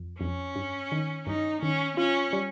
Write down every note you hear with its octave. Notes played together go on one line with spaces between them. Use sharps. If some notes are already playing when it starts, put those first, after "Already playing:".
Already playing: F2
F2 C#4
G2
D#3
G2 D#4
D#3 C#4
C#4 F4
G3